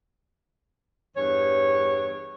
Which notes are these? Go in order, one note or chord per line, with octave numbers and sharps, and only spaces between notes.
E2 G2 C#5